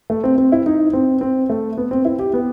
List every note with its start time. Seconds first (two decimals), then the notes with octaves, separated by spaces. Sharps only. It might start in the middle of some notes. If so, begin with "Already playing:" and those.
0.10 A3
0.24 C4
0.38 C4
0.52 E4
0.66 D#4
0.93 C4
1.21 C4
1.50 A3
1.77 B3
1.91 C4
2.05 E4
2.19 G4
2.33 B3